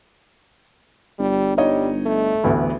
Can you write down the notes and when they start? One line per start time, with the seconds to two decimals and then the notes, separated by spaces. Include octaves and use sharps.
1.19 G1 G3
1.58 G3 D#4 C#5 D#5
2.06 A3
2.44 A1 D2 B3